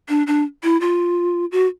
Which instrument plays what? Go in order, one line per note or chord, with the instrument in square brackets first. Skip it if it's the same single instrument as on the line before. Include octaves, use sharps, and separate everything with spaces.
[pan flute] D4
D4
E4
F4
F#4